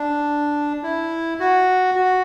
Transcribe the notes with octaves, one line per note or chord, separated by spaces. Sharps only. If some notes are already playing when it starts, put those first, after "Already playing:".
Already playing: D4
E4
F#4
F#4